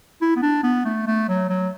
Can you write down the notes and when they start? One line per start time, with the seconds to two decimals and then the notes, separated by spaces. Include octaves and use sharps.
0.22 E4
0.36 B3
0.42 D4
0.63 B3
0.85 A3
1.07 A3
1.29 F#3
1.49 F#3